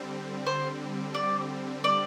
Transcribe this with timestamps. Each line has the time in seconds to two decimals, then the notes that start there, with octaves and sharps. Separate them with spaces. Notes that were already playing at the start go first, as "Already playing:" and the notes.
Already playing: D3 G3 C4
0.46 C5
1.14 D5
1.84 D5